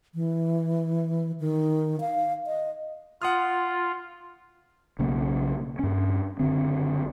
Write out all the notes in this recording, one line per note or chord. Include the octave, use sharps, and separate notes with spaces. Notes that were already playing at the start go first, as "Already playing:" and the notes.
E3
D#3
F5
D#5
F4 F#5 D#6 F6
B1 C#3 A#3
G2 C#4
F#1 D3 C4